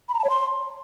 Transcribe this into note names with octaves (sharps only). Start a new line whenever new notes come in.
B5
A#5
A5
C#5
C6